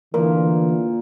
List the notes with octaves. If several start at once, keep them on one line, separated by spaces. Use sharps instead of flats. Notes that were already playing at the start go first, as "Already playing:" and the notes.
A#2 D3 E3 A#4